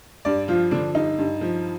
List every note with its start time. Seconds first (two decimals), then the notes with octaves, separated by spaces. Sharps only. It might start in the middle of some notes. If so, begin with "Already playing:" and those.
0.25 G2 D5
0.48 F3 F4
0.71 D3 D4
0.95 G2 D#4
1.18 G2
1.41 F3